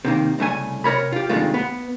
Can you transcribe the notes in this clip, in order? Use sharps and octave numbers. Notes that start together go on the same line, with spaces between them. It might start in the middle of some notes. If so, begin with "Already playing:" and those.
C3 D#3 A#3
C2 C#3 A3 G#5
C3 A#4 C#5 B5
F4 G4
G2 C3 D#3 G#3 A3 F4
B3